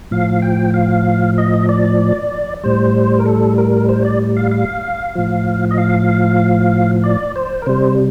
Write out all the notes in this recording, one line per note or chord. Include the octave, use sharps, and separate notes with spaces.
A2 F3 F5
G5
F5
D#5
D5
A2 G3 C5
A#4
A4
A#4
C5
D5
F5
F5
A2 F3
D#5
F5
D5
C5
A#4
C3 G3 C5